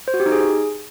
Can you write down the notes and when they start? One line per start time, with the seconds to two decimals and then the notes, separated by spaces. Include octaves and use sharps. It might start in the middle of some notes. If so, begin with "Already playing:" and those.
0.08 C5
0.14 F#4
0.20 G4
0.26 D#4
0.32 G#4